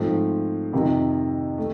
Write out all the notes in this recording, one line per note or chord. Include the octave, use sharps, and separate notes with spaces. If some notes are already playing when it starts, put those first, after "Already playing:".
Already playing: G#2 F3 A3 C4
F2 C3 D#3
A3